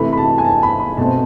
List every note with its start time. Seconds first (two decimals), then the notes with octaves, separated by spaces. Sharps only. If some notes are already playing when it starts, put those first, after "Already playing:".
Already playing: C3 E3 A3 B5
0.13 B5
0.18 A5
0.38 G#5
0.45 A5
0.63 B5
0.80 B5
0.97 B2 A3 C4 A5